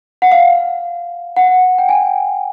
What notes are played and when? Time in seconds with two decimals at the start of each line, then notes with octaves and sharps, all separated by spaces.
0.22 F#5
0.32 F5
1.36 F#5
1.78 G5
1.89 G#5